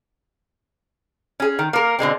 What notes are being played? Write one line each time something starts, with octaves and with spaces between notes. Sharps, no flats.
C#4 G#4
D#3
A#3 A#4
B2 D3 G#3 C4